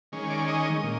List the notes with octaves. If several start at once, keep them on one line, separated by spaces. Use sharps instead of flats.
D#3 G#3 C#4
D5
D#5
A#2